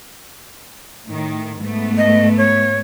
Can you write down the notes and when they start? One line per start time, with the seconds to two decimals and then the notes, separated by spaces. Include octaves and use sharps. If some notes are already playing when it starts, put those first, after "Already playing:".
1.06 A2 D#3
1.60 G#2 A3 B3
1.97 D#5
2.38 C#5